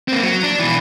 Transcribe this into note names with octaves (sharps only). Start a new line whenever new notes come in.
A#3 C4
F#3
D4
B2 E3